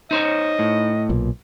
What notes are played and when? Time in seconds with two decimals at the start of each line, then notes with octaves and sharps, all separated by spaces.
0.11 D#4 C5 C#5 D#5
0.59 A2
1.09 B1 A#2